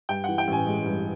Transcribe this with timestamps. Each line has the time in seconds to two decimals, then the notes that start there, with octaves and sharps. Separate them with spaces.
0.09 G2 G5
0.24 E3 F#5
0.38 G5
0.48 A1 G#5
0.66 G#3
0.86 G2